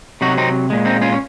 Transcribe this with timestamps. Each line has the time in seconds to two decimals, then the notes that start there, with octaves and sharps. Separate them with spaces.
0.21 C3 F#3 D#4 F#4
0.38 C4 D#4
0.70 A#2 G#3
0.85 C4 D#4
1.01 C#4 F4
1.12 C#4